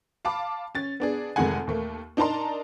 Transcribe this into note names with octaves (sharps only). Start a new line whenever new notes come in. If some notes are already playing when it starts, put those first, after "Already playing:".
F5 A5 B5 D6
C#4 A6
B3 D4 G#4
F1 F2 D#3 G#3 F#5 G#5
D#2 A3 A#3
D4 D#4 A#4 A5 A#5 C6